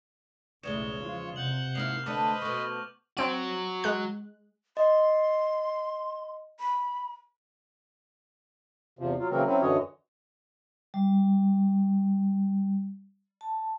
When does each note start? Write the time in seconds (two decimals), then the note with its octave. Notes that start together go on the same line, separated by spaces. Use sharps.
0.63 B1 E2 A2 C#3 G#3 C#5 E7 G7
1.00 F3 F4
1.36 C3 F#5 G6 F#7
1.75 G#2 A#3 E4 F6 C7 F7
2.06 D3 A3 B4 C5 D#5 D6
2.42 B2 A3 C#6
3.17 F#3 C4 F#4 D7
3.84 G#3 F#6
4.77 D#5 C6
6.60 B5
8.99 E2 C3 F3
9.19 F#3 F4
9.31 C#3 E3 F#3 A#3 C4 A#4
9.46 F#3 C4 C#4 E4
9.61 F#2 D3 E3 F#4 C#5 D#5
10.94 G3
13.41 A5